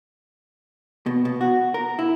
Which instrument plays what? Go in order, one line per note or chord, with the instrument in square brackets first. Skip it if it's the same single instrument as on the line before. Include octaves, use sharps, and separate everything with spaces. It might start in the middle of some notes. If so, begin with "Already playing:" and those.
[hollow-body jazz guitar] B2
B2
F#4
A#4
E4